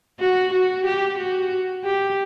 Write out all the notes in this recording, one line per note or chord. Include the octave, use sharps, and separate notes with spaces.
F#4
F#4
G4
F#4
G4